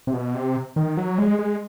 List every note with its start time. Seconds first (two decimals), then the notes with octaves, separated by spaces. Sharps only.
0.07 C3
0.13 B2
0.34 C3
0.76 D#3
0.97 F#3
1.18 G#3
1.39 G#3